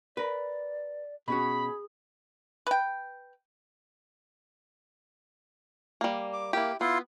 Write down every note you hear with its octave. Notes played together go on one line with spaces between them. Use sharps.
A#4 B4 D5
B2 C#4 F#4 G#4 B5
B4 G5
G3 A#3
D6
A#3 E4 G4
B3 E4 F4 C6